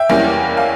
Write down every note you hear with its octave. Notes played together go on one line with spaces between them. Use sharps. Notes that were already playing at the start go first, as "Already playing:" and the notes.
Already playing: E5 G5
E2 E3 G3 A#3 C#4
F5 G#5